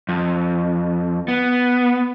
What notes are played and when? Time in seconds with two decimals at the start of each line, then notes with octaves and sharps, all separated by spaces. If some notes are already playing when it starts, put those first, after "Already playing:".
0.09 F2
1.28 B3